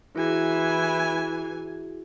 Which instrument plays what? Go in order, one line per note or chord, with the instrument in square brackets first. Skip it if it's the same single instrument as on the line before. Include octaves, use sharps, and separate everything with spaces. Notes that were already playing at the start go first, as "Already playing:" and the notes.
[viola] E3 G#5 [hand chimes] E4 F#4 G#4